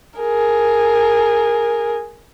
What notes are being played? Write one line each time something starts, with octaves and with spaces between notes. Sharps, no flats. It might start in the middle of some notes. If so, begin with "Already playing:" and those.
G#4 A#4